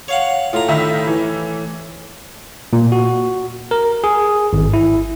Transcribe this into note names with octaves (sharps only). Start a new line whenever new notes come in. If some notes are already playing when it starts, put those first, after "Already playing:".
C#5 F5 F#5
A2 F4 A#5
D#3 E5 B5
E3
A#2
F#4
A#4
G#4
G#1
E4